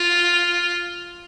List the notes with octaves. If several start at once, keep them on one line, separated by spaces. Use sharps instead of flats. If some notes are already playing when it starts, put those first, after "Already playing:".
Already playing: F4